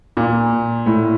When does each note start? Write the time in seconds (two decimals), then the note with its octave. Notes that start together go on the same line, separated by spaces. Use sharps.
0.17 A#2
0.86 A2